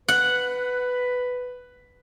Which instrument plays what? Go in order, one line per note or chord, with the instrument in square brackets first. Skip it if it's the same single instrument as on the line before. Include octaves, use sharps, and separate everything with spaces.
[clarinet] B4 [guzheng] F#5